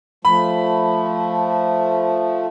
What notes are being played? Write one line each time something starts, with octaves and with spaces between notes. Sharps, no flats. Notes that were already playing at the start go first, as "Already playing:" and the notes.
F3 A3 B5